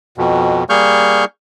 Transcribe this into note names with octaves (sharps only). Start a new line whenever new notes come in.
F2 B2
G3 A#3 G#4 C#6 F6 G6